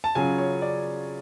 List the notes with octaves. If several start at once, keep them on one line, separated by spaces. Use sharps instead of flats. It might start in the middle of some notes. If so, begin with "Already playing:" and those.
A5
C#3 F#3 C#4 F4 G#5
C#5
D5